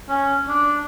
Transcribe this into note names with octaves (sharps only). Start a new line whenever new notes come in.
C#4
D4